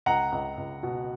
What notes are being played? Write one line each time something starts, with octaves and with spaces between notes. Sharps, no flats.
C#2 F#5 A#5
C#2
C#2
B2